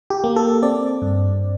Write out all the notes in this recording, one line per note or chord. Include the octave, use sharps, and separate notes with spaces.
G4
A#3
A4
C4 D5
G2